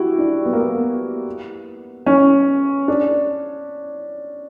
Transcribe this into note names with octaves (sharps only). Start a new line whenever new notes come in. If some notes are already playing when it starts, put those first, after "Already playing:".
Already playing: E4 F#4 G4
D4
B3
A#3
B3
C#4
D4